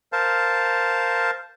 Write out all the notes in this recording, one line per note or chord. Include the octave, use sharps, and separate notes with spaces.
A#4 C5 F5 A5